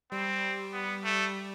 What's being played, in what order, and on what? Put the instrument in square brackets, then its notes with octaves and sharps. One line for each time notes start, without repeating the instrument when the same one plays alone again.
[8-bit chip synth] G3 [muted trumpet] C4
[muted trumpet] B3
A3